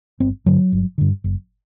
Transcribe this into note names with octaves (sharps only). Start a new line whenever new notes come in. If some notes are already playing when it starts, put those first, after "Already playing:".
G1 C4
G2 D3 F#3
G1
G2 D3
F#1